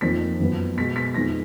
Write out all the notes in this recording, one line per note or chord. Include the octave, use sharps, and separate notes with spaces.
F2 D#3 A#3 B6
F#2 F3 B3
B2 G#3 B3 B6
B6
F2 D#3 G#3 B3 A#6